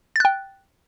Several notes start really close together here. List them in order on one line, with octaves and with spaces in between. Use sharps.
A6 F#6 G5